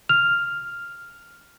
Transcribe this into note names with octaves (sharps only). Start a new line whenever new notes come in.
F6 F7